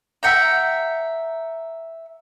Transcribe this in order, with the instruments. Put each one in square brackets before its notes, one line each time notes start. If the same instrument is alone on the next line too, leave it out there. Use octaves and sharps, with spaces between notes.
[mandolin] E5 F#5 G5 A#5